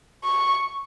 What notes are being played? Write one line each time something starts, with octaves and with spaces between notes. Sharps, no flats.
C#6